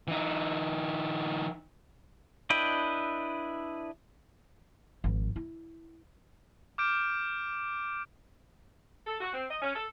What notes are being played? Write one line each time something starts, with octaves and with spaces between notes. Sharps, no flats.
E3 D#4
D4 E4 B4 D#5 G5
G#1 F3
E4
D6 F6 G6 D7
A4
F#4
C4
D#5
C#4
A4